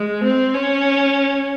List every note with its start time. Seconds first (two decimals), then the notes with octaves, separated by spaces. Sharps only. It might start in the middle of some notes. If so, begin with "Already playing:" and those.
Already playing: G#3
0.24 C4
0.54 C#4